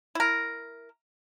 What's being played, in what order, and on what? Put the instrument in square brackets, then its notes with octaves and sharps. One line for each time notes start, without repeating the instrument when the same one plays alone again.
[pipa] E4 A#4